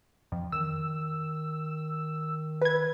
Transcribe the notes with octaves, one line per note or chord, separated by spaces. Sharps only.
F2
D#3 E6
B4 G#6